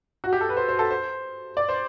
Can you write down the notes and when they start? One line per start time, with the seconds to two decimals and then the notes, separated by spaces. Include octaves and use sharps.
0.24 F#4
0.33 G4
0.41 A4
0.49 B4
0.57 C5
0.69 C5
0.79 A4
0.91 C5
1.57 D5
1.69 C5